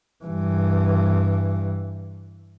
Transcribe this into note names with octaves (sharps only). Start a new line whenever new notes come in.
G2 E3